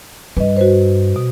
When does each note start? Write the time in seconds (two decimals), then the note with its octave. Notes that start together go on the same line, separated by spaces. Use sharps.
0.37 G2 B4 D#5
0.57 F#4 B4 C5
1.16 B2